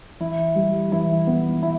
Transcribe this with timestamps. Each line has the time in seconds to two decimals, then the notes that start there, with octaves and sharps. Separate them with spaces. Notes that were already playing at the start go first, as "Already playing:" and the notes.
0.20 E3 E4
0.55 G3
0.92 E3 E4
1.27 B3
1.63 E4